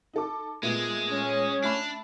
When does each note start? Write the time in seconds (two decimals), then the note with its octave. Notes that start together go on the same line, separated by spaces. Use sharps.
0.14 D#4 A4 D6
0.63 A#2 G#3 A3 B3
1.09 C#4
1.64 A3 D4 B5 F7